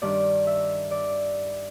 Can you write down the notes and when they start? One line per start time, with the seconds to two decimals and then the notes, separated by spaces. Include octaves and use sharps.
0.02 G2 D#3 D5
0.47 E5
0.91 D5